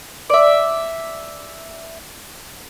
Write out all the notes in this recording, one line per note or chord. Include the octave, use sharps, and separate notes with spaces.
D5 E5